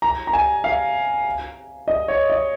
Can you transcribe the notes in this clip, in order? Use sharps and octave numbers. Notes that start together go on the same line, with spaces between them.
A#5
A#5
G#5
F5
D#5
C#5
D#5